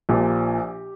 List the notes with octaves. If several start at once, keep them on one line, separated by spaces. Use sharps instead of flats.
A#1 A#2 F3 G4